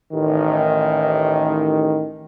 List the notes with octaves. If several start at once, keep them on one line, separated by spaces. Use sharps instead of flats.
A1 D#3